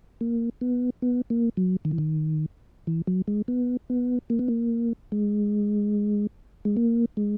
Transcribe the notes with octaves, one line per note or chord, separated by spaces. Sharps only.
A#3
B3
B3
A#3
F#3
D#3
E3
D#3
E3
F#3
G#3
B3
B3
A#3
B3
A#3
G#3
G#3
A#3
G#3